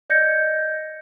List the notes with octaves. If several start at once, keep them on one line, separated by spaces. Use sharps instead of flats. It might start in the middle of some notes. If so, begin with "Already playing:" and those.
D5 D#5 G6 G#6 A#6 C#7